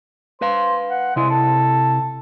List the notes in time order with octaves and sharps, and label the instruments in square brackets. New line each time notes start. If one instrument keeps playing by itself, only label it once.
[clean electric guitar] B4 F5 [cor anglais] C5
[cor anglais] F#5
[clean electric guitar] C3 E4 [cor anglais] G#3
[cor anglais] A4